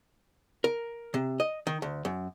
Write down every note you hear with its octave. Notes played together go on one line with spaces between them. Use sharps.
A#4
C3
D#5
D#3
D2
F#2